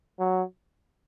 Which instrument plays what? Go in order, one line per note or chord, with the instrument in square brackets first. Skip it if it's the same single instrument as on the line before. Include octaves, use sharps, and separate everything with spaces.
[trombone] F#3